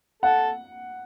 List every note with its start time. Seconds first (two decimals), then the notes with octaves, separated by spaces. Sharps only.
0.22 A4 F#5